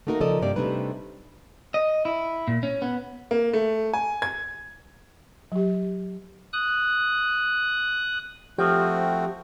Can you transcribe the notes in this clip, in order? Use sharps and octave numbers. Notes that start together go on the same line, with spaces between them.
A3 A#3 D#4 F#4 A#4
C#3 F3 A4 A#4 D5 D#5
G2 C3 A#3 G4 D5
C3 G3 A3 D4 D#4 B4
D#5
E4
A#2
C#4
B3
A#3
A3
G#5
G#6
F#3 G4
D#6 F#6
F3 A3 C4 F#4 G4 G5